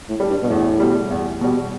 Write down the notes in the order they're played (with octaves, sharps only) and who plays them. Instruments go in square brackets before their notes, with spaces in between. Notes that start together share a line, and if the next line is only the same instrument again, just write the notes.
[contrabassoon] A2
[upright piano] G3 D4
[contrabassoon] G2
B2
[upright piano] E2 [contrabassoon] A2
[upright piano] B2 G3
E2
B2 G3